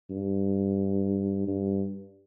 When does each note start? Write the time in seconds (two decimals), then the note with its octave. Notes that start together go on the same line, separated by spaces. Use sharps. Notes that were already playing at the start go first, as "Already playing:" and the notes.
0.10 G2
1.47 G2